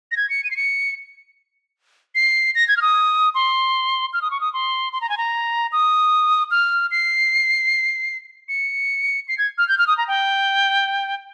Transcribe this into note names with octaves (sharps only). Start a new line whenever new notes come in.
A#6
G#6
C#7
D#7
C7
C#7
C7
A#6
G#6
F6
D#6
C6
F6
D#6
C#6
D#6
C6
C6
A#5
G#5
A#5
D#6
F6
C7
C#7
C7
G#6
F6
G6
F6
D#6
A#5
G5